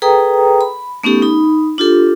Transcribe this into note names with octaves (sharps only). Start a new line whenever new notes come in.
G#4 A4 B4 G5 A#5 D#6
B5
A3 B3 C#4 D#4 G4 A4
D#4 B5
D4 F4 G4 A4